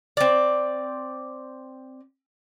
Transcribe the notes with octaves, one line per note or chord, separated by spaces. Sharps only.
C4 D5